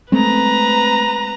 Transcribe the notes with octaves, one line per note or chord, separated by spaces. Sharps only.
G#3 A3 C4 B4 A#5